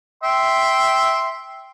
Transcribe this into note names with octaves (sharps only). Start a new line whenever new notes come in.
E5 G5 C6